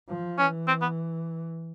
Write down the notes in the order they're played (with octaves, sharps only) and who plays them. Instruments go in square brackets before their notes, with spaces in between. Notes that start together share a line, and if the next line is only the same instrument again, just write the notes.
[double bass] F3
[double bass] E3 [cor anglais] C#4
[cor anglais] C4
B3